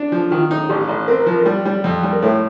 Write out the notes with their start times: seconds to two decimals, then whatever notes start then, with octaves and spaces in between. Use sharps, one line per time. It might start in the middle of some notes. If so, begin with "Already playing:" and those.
Already playing: D4
0.12 F3
0.31 D#3 F4
0.51 D#4
0.69 A1 G4
0.89 A1
1.08 C4 A#4
1.26 F3
1.46 G3
1.65 G3
1.84 F2
2.03 G3
2.13 A#4
2.22 A2 A4